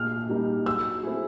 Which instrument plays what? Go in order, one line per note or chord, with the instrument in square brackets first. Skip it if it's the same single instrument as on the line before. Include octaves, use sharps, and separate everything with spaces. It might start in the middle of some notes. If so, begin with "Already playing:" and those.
Already playing: [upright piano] A#2 [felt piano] F6
[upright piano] G3 A#3 D#4
[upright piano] F#3 [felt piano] E6
[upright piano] A3 C4 E4 G#4